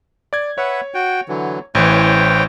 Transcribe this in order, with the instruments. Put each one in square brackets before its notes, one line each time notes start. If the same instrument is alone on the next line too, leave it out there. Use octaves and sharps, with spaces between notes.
[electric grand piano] D5 G#6
[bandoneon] B4 E5 F#5 [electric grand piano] C#5
[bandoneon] F#4 G5
D3 E3 F#3
[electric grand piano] A1 E3 [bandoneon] C5 C#5 G5